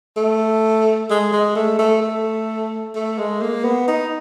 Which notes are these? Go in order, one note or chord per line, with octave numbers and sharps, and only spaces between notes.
A3
G#3
G#3
A3
A3
A3
A3
G#3
A#3
B3
D#4